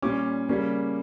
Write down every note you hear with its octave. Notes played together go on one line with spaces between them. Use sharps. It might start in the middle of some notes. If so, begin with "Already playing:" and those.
A#2 G3 C#4 D6
C#3 G3 A#3 C#4